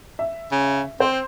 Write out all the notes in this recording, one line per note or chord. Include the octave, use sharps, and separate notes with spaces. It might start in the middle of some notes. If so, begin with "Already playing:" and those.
E5
C#3
C4 C5